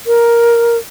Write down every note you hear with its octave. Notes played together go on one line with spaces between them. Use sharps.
A#4